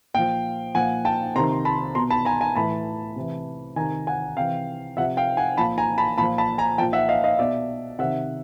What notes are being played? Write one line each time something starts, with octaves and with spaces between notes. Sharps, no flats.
A#2 F3 F5 G5
A#2 F3 F#5 G#5
G5 A5
C3 D#3 A#5 C6
A5 B5
B2 A#5 C6
A5 B5
G#5 A#5
G#5 A#5
A2 E3 A5 B5
C3 E3
C3 D#3 G#5 A#5
F#5 G#5
C3 E3 F5 G5
C3 F3 E5 F#5
F5 G5
F#5 G#5
A#2 F3 A5 B5
G#5 A#5
A5 B5
A#2 F3 A5 B5
A5 B5
G#5 A#5
A#2 F3 G5 A5
E5 F#5
D#5 F5
D#5 F5
B2 D5 E5
C3 D#3 E5 F#5